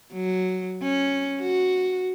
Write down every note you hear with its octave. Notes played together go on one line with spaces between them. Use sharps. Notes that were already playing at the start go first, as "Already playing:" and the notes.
F#3
C#4
F#4